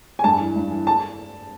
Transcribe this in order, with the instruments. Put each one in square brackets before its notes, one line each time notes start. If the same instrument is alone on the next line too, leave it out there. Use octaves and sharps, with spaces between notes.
[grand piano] G#5
G2 A5
E3
G2
E3
A5